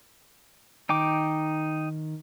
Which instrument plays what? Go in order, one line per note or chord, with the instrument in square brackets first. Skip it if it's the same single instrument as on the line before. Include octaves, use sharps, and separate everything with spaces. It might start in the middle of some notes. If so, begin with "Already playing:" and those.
[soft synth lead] D#3 [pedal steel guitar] D#4 G5 D6